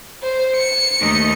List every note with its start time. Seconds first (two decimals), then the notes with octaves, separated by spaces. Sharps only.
0.23 C5
0.56 C#7
1.00 D#2 A3 D#4